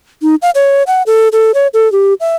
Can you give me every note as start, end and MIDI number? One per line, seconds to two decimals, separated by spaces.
0.23 0.35 63
0.42 0.50 77
0.55 0.83 73
0.87 1.03 78
1.07 1.28 69
1.33 1.51 69
1.54 1.67 73
1.74 1.91 69
1.92 2.14 67
2.20 2.36 76